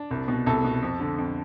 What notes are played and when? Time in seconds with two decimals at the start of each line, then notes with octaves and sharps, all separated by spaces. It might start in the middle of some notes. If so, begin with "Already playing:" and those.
Already playing: D4
0.11 C2
0.28 B2
0.46 C2 A4
0.65 B2
0.83 F2
1.00 D3
1.18 F2